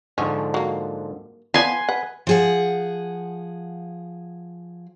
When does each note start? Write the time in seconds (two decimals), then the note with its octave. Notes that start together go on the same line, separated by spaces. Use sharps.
0.18 G#2 D3 F3 C#4
0.54 F#3 A#3
1.54 F3 B3 B4 D5 G#5 C6
1.89 B4 F#5
2.27 F3 G#4 F#5